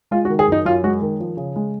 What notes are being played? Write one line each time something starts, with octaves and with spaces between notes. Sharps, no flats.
G#3 F4
F#4
D#3
G#4
F#2 D#4
F#2 F4
G#3 F#4
D#3
F3
C#3
G#3